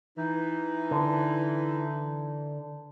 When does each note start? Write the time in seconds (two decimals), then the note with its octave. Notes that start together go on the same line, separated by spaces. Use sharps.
0.18 E3 D#4
0.91 D3